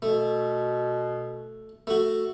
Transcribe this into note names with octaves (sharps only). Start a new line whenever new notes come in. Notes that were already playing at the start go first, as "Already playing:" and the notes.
B2 A3
A3 F#4